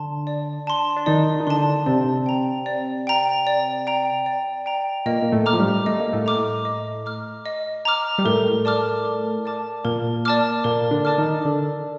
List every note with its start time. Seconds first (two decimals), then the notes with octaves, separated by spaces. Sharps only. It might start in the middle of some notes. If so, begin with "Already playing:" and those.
Already playing: D3 D4 A5 C6
0.27 D5
0.67 A5 C6
0.96 D4
1.06 D#3 D#4 D5
1.40 D#4
1.47 D3 D4 A5 C6
1.86 C3 C4 D5
2.26 G5 A#5
2.66 D5
3.07 G5 A#5
3.47 D5
3.87 G5 A#5
4.26 D5
4.66 G5 A#5
5.06 A#2 A#3 D#5
5.22 A#3
5.32 A2 A3
5.46 A#5 D6 F6
5.53 F3
5.59 G2 G3
5.86 A3 D#5
5.99 A#3
6.13 A2 A3
6.26 A#5 D6 F6
6.65 D#5
7.05 A#5 D6 F6
7.46 D#5
7.85 A#5 D6 F6
8.18 G3
8.25 A2 A3 A#4
8.65 D5 A5 D6 F6
9.05 A#4
9.45 D5 A5 D6 F6
9.84 A#2 A#3 A#4
10.25 D5 A5 D6 F6
10.64 A#2 A#3 A#4
10.91 D3 D4
11.05 D5 A5 D6 F6
11.18 D#3 D#4
11.45 D3 D4 A4